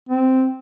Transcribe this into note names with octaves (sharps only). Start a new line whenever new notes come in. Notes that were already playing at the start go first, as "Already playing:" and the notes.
C4